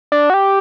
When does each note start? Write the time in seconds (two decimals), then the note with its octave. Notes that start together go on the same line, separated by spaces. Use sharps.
0.12 D4
0.30 F#4
0.34 G4